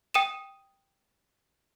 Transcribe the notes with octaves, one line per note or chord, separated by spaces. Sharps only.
G5 D#6 D#7 E7